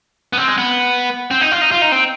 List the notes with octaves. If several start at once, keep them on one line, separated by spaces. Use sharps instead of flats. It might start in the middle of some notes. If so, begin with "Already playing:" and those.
B3
C4
G#3
B3
C4
D#4
F4
D#4
F4
D#4
C4